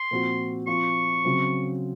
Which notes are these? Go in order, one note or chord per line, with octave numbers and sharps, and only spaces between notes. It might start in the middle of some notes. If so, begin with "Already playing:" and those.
Already playing: C6
A#2 F3 C4 F#4
F3 C4 F4 C#6
C#3 F#3 C4